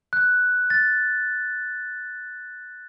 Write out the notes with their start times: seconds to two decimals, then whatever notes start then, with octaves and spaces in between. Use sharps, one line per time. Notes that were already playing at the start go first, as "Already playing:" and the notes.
0.13 F#6
0.70 A6